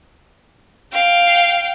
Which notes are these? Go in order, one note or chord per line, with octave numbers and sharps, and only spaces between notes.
F5 G5